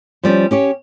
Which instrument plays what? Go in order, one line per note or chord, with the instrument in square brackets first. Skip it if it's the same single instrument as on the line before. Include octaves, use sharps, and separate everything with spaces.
[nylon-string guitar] F3 G3 C4 C#4
C#4 G4 C#5